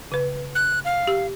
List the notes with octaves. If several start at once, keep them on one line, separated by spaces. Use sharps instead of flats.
C#3 B4
F#6
F5
G4 E6